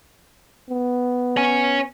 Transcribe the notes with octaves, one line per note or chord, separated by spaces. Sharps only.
B3
C#5 G#5